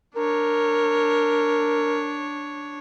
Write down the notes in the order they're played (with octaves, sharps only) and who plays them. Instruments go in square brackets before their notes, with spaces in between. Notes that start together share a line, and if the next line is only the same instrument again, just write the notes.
[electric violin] D4 C#5 [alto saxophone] A#4